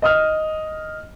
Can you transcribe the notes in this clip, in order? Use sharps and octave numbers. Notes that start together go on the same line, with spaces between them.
D#5 D#6 F6